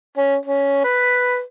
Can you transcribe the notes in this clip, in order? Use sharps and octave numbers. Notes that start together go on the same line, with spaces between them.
C#4
C#4
B4